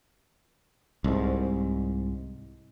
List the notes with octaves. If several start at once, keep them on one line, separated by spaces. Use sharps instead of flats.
C2 G#2